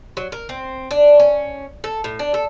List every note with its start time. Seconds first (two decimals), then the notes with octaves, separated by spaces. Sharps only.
0.17 F#3
0.32 A#4
0.49 C4
0.91 D4
1.20 C#4
1.84 A4
2.04 A2
2.19 D4
2.34 A4